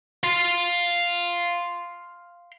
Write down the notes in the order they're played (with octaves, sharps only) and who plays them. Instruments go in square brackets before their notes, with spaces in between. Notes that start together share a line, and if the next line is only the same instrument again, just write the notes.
[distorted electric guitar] F5 C6